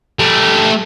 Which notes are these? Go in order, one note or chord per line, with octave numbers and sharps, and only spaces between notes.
A3 G4